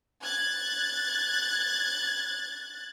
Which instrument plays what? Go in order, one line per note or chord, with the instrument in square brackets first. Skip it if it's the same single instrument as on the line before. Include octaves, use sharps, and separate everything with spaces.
[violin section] F#6 G#6 A6